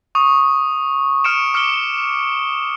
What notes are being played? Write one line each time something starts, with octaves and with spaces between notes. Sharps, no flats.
C#6 D#6
C#6 D#6 F6 C#7 D7 E7
D6 F6 C#7 D7 G7